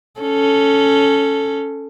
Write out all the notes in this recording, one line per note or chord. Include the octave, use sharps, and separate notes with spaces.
C#4 A4